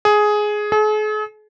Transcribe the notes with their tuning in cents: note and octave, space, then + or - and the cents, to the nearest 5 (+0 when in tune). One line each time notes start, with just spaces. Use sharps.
G#4 +10
G#4 +45